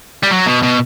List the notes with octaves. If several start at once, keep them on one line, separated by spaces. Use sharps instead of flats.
G3
F#3
B2
B2